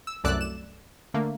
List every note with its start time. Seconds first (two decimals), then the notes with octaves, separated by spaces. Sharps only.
0.07 E6
0.24 C2 F#2 A3 D5 E6 F#6
0.41 E7
1.14 D3 A3 A#3